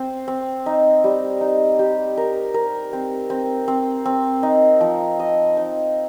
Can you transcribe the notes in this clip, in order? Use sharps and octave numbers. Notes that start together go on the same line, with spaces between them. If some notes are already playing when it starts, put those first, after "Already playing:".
Already playing: C4 C5
C4
D#4
G3
D#4
G4
A#4
A#4
C4
C4
C4
C4
D#4
F3
D#5
D#4